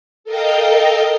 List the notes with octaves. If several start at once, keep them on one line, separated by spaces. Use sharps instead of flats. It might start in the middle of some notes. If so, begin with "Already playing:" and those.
A4 A#4 D#5 F5 G5 G6